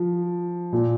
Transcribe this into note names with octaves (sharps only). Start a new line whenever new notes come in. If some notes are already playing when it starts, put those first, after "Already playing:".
Already playing: F3
A#2